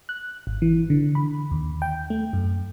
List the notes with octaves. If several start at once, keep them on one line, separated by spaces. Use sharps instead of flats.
F#6
G#1
E3
D3
B5
D#2
G5
A3
F#2